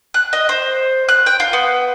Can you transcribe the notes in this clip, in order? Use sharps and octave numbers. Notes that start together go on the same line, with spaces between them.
F#6
D#5
C5
F#6
G5
F4
B3